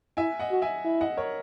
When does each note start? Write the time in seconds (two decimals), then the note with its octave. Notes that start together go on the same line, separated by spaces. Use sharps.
0.17 E4 E5 G#5
0.40 D#5 F#5
0.51 F#4
0.62 E5 G#5
0.84 E4
1.01 D#5 F#5
1.17 A#4 C#5